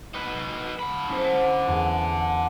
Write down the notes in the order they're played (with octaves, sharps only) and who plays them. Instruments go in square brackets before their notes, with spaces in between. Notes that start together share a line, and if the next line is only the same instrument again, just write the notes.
[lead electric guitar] D#4 B4
D3 B5
[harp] C#4 E4 C5
E2